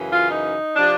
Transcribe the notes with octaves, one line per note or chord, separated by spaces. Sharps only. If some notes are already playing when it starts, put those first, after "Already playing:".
Already playing: F#2 C#3 E3
F4
D#4
C3 F3 D4